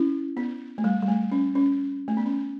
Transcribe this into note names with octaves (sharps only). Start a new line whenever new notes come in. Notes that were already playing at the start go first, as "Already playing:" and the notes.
Already playing: C#4 E4
B3
A3
G3
G3
A3
C#4
C#4
A3
B3
C#4